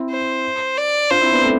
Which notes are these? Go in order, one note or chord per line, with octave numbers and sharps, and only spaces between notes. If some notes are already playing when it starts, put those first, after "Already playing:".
Already playing: C4 E4
C5
D5
D4 F4 C5
C4 E4
B3 D4
A3 C4